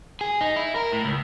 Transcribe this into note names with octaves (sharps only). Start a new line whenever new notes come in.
G#4
D#4
E4
A#4
A2
C#2